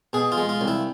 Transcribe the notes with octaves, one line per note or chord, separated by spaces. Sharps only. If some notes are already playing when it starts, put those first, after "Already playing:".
B2 G#4
F4
G#3
F4
C2
E4